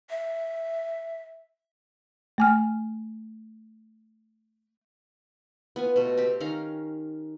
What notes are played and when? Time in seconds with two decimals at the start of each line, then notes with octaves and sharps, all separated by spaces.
0.10 E5
2.38 A3 G#5 F6
5.76 B3 F4 G#5
5.96 B2 A3
6.17 C4 G4
6.40 D#3 C#4 F5 A#5